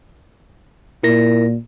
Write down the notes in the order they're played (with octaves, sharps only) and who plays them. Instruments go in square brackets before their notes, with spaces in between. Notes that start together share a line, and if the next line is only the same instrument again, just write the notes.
[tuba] A#2 [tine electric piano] E4 A#4 A#6